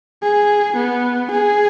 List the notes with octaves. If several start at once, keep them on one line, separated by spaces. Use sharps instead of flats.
G#4
B3
G#4